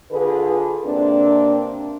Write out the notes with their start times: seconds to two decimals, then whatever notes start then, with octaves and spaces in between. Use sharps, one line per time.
0.12 D3 F4 G#4 B4
0.86 C3 A#3 C4 D4